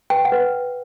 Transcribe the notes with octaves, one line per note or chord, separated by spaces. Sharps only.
B4 G5
F#5
B4